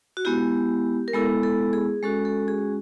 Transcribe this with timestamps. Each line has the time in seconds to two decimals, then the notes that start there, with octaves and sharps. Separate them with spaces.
0.17 F#4
0.25 G#3 B3 E4 G4
1.08 A#4
1.13 G#3 B3 E4 A4
1.43 A4
1.73 G#4
2.03 G#3 C#4 F#4 A4
2.25 A4
2.48 G#4